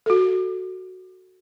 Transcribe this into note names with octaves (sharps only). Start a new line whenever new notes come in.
F#4 A4